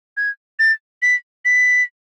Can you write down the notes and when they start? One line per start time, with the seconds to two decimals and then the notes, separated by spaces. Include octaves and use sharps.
0.17 G#6
0.59 A6
1.02 B6
1.45 B6